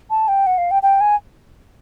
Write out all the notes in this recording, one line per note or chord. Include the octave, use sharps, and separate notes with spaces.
A5
G5
F#5
F5
G5
G5
G#5